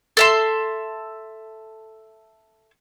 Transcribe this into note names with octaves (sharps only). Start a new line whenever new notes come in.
A4 E5 C6